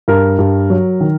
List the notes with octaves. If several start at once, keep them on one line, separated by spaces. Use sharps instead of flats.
G2 A#4
G2
F#3
D#3